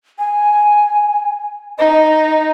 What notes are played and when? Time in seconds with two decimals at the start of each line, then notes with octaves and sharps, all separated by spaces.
0.19 G#5
1.78 D#4 D#5